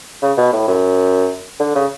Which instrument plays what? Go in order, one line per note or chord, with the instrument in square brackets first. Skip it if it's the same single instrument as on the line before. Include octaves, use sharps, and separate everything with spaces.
[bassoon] C#3
B2
A2
F#2
D3
C#3